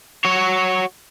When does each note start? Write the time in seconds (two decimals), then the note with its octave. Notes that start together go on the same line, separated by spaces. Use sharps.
0.25 F#4 C#5